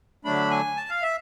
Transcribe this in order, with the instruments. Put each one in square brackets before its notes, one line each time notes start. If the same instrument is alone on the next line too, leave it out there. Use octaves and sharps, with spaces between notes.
[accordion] D3 F#3 A3 D4 B5
G#5
A5
F5
E5